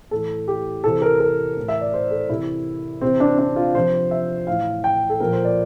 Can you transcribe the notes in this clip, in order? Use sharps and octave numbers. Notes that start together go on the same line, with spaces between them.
A2 E3 A4
G4
C3 E3 A4
A#4
A#4
A2 E3
E5
D5
C5
A4
C3 E3 E4
C3 E3 C4
D4
D4
F4
C3 F3 C5
E5
A2 E3 F5
G5
A4
A#2 F3 A#4
C5
D5